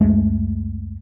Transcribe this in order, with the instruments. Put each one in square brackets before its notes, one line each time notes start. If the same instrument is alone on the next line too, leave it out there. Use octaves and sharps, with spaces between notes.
[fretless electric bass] C#2 F#2 G#3 A3